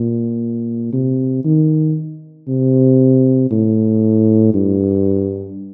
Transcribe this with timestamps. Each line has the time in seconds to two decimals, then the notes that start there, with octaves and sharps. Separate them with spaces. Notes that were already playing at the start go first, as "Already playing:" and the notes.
Already playing: A#2
0.93 C3
1.44 D#3
2.48 C3
3.51 A2
4.54 G2